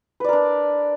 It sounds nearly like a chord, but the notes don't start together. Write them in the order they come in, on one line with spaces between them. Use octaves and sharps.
B4 D5 A#4 D4